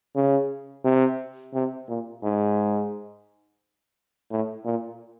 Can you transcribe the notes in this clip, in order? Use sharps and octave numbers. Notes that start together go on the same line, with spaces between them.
C#3
C3
C3
A#2
G#2
A2
A#2